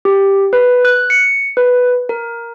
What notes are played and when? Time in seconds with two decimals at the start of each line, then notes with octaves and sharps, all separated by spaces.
0.05 G4
0.53 B4
0.85 F#6
1.10 C#7
1.57 B4
2.09 A#4